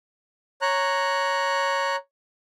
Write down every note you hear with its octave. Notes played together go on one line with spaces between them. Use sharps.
C#5 A#5 F#6